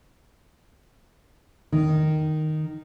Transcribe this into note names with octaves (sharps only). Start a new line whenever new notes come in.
D#3